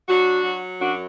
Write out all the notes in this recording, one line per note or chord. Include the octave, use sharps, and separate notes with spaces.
F#3 D4 F#4
F#3
F#2 D4 F#4